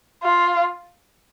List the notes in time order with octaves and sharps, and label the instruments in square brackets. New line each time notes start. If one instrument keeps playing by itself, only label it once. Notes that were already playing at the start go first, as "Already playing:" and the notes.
[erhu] F4